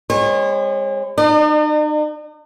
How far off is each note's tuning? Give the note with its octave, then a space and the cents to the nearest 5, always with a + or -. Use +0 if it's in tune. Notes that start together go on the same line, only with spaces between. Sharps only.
G#3 -40 C4 +0 C#5 -35
D#4 -40 D5 +45